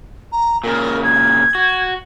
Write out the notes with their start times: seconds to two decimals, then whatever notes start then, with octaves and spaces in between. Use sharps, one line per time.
0.32 A#5
0.64 A#2 C#3 A#4
1.04 G#6
1.55 F#4